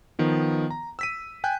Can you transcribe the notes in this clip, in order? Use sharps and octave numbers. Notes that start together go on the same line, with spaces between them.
D#3 F3 B3
A#5
E6 B6 D#7
G5 G#5 F#6 G6